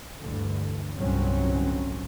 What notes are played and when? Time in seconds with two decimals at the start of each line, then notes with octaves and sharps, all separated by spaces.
0.19 D2 G2 D3 E3
0.96 G1 C2 A2 F#3 C4 C#4